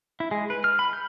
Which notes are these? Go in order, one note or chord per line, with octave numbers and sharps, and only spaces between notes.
E4
G#3
B4
F6
B5
G6